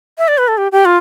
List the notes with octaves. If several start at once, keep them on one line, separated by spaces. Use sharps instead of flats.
E5
D5
B4
A4
G4
G4
F4